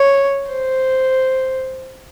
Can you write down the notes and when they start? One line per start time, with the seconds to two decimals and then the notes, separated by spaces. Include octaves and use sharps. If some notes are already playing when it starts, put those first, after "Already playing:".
Already playing: C#5
0.50 C5